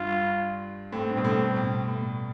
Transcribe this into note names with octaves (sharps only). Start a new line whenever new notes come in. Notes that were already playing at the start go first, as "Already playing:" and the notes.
Already playing: G2 F4
A2 C4
G2
B2
A2
G2
B2
A2